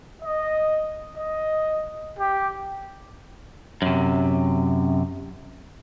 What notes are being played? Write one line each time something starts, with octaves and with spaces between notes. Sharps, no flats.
D#5
D#5
G4
F#2 C3